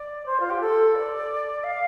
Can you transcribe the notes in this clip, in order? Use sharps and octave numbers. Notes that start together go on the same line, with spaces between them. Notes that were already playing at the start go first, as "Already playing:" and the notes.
Already playing: D5
C5
F4
G4
A4
D5
F5